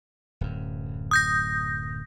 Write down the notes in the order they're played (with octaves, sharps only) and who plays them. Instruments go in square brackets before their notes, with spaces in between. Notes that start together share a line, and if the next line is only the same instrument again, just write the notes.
[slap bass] D1 F#2
[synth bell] D#6 G6 A#6